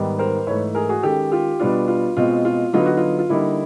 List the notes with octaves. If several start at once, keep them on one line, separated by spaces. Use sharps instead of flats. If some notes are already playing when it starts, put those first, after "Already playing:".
Already playing: G#2 D#3 G3 B3
A#4 C5
G#2 E3 A3 B4 C#5
G#4 A#4
F#4 G#4
D#3 G#3 C#4 G4 A4
F4 G4
B2 G3 B3 D4 F4
F4
B2 G#3 C4 F4
F4
D3 F#3 B3 D#4 F4
F#4
F4
F4
D3 G3 A#3 D#4 E4